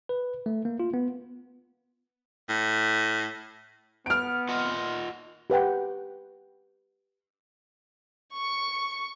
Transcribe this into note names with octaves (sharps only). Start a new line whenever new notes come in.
B4
A3
A#3
F4
B3
A2
B3 F6 D7
F4 D#5 F#5
G4 B4 F#5 G5
C#6 C#7